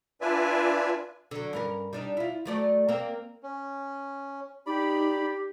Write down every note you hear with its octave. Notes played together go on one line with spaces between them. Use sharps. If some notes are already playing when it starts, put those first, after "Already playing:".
D4 F4 B4 D5 E5 G#5
D3 F#3
G2 C#4 A#4
G3 D4 D#4
E4 F4
F#3 A3 D5
A#3 C4
C#4
D#4 G4 D5 B5